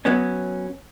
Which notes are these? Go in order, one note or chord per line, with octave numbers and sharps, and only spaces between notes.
F#3 B3 C#4